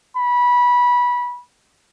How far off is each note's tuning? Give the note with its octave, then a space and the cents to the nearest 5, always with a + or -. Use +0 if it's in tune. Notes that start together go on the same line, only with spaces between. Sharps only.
B5 -20